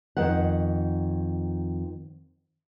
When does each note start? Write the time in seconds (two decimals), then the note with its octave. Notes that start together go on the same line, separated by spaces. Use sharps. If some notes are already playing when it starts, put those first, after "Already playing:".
0.17 F2 D#3 F#5